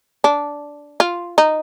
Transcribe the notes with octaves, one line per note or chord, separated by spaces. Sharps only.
D4
F4
D#4